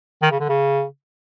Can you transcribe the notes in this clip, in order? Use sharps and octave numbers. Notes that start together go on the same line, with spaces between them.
D#3
C#3
D3
C#3